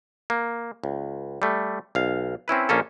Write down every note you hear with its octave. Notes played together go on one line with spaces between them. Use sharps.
A#3
C#2
G3 A3
B1 F5
C4 C#4 E4 B4
A#1 A#3 C#4 A4